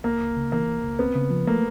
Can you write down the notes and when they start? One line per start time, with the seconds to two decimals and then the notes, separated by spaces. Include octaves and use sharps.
0.04 C#2 A#3
0.20 C#2
0.37 C#3
0.52 E3 A#3
0.68 C#2
0.84 C#2
0.99 B3 C4
1.15 C#3
1.30 F3
1.47 A3 A#3